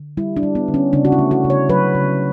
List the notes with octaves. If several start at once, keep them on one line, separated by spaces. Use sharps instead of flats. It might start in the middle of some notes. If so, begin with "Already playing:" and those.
Already playing: D3
G3 E4
D4
G3
B3
D3
C#4
C#3 D4
F#4
E4
A3
F#4
C#3
C#5
F#3 B4
C#3